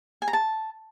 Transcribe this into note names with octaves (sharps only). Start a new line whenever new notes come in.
G#5
A#5
A5